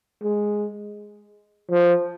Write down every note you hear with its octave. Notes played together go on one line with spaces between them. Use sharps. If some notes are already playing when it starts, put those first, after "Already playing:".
G#3
F3